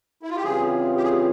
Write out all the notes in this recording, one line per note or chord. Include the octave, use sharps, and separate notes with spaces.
E4
F4
G4
C#3 E3 G3 C4 F4 G#4
G4
G#4